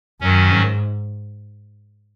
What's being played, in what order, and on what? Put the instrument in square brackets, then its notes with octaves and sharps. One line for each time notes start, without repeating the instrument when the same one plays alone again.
[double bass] F#2 [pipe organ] D#3 F#3 C#4
[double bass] G#2